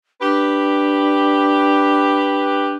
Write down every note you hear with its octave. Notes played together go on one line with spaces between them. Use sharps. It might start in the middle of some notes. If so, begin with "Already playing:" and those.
D4 G4 B4